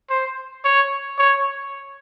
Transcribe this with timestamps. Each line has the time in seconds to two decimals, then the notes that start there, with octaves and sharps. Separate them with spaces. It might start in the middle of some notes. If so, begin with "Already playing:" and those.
0.10 C5
0.65 C#5
1.18 C#5